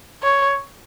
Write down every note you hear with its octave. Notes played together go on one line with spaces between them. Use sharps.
C#5